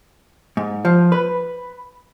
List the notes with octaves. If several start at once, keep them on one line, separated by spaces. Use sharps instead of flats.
G#2
F3
B4